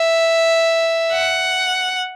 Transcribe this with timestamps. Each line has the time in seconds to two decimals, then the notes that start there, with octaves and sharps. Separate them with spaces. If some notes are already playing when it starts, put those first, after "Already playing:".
Already playing: E5
1.12 F#5